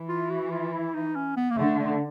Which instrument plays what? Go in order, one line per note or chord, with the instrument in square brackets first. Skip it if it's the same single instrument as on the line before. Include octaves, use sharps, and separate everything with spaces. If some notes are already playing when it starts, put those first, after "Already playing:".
Already playing: [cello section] E3
[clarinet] F4
F#4
F4
E4
D#4
C#4
B3
A#3
[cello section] D3 [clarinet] A3
[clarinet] A3